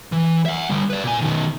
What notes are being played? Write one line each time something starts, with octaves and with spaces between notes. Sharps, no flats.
E3
E5 F#5
D3 G3
B4 D5
A#2 G#5
B2 D#3